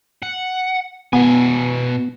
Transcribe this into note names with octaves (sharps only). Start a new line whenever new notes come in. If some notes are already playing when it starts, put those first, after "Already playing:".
F#5
B2 B3 G#5